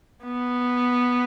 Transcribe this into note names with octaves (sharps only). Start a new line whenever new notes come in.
B3